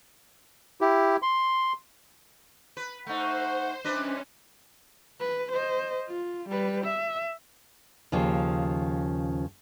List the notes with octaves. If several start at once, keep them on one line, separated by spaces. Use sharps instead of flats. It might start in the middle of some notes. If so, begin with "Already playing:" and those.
E4 G4
C6
B4
A3 D#4 C5 E5 F#5
E3 G3 C#4 D4 B4 C5 D#5
B4
C5 D#5
F4
G3 B4
E5
D#2 C#3 F3